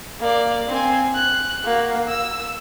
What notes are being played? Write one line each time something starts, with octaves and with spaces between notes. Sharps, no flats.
A#3 D5
C4 G#5
F#6
A#3 F#4
E6